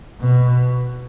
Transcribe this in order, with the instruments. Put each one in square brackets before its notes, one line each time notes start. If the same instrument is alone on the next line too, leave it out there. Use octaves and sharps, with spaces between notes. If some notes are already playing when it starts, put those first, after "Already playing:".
[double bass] B2